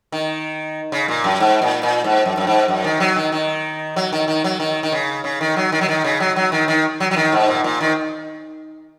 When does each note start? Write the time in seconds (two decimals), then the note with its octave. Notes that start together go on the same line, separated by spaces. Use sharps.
0.12 D#3
0.92 C#3
1.08 A#2
1.24 F#2
1.40 G#2
1.62 A#2
1.83 A#2
2.04 G#2
2.25 F#2
2.37 F#2
2.47 G#2
2.68 F#2
2.84 D#3
3.00 F#3
3.16 D#3
3.32 D#3
3.96 F#3
4.12 D#3
4.28 D#3
4.44 F#3
4.60 D#3
4.83 D#3
4.92 C#3
5.24 C#3
5.41 D#3
5.56 F#3
5.72 D#3
5.81 F#3
5.88 D#3
6.04 C#3
6.20 F#3
6.36 F#3
6.52 D#3
6.68 D#3
7.00 F#3
7.11 F#3
7.16 D#3
7.32 G#2
7.48 A#2
7.64 A#2
7.81 D#3